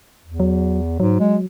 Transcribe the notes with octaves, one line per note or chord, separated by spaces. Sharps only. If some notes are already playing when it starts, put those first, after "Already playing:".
E2
F#3
G#2 F#3
G#3